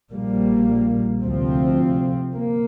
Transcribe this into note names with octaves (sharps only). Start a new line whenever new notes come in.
A#1 A#2 G3 A#3
D2 C3 F3 C4
A#3